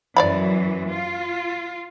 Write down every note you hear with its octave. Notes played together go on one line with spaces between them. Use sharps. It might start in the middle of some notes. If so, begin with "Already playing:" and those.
F#2 E3 D5 F5 B5
F4